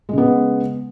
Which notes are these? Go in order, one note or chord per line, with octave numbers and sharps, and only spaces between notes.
C#3 G#3 B3